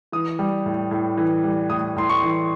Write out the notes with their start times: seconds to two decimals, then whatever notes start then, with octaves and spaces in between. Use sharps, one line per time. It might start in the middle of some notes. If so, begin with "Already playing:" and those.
0.12 E3 D#6
0.39 G3
0.66 A2
0.91 A2
1.17 E3
1.44 G3
1.70 A2 D#6
1.97 A2 C6
2.10 C#6
2.23 E3